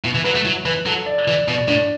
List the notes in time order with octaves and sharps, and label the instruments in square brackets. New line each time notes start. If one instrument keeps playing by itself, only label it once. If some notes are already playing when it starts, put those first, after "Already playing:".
[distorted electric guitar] B2 [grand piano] E4
[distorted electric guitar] E3
[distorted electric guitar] F#3 [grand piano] B4
[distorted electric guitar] A3
[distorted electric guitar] F#3 [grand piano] E4
[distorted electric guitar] E3 [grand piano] B4
[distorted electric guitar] F#3 [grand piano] A4
[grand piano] D5
[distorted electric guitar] E3 [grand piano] D5
[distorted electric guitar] B2 [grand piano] D5
[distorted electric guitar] A2 [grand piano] D4